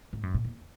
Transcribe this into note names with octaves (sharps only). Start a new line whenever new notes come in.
G#2
F#2
A#2
E2